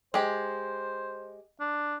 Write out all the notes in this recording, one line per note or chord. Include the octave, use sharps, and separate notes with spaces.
G#3 G4 C5
D4